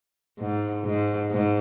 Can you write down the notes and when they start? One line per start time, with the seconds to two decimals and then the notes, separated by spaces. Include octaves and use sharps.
0.39 G#2
0.85 G#2
1.31 G#2